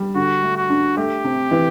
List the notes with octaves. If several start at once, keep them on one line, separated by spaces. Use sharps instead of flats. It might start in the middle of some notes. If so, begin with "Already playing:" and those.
Already playing: G3
D3 F#4
A3
F#4
D4
A3 G4
C3
E3